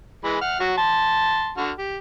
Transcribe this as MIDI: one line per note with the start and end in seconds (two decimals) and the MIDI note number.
0.24 0.37 52
0.24 0.37 56
0.24 0.37 83
0.41 0.60 78
0.41 0.60 89
0.60 0.75 54
0.60 0.75 66
0.78 1.52 81
0.78 1.52 84
1.58 1.71 50
1.58 1.71 66
1.58 1.71 89
1.78 1.97 67